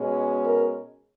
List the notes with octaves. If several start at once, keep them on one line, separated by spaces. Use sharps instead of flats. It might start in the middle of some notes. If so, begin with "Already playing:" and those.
Already playing: B2 G#3 C#4
A#4